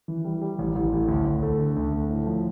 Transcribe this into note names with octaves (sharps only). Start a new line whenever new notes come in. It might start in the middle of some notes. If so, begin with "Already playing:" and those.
E3
G3
G3
A1
A1
A2
D2
D2
A3
D3
D2
A3
A2
F3